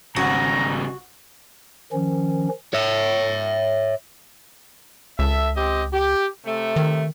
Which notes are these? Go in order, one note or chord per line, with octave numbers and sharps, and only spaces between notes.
G#1 C#3 G3 F#4 F#5 A#5
D#3 F3 C#4
C#5 E5
C#2 A4 E5
C4 G4 D#5
G4
C3 A3
D#3